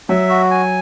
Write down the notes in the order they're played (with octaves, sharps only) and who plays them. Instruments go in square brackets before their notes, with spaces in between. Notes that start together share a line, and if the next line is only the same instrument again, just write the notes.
[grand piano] F#3 [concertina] E5
[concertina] F#4
G#5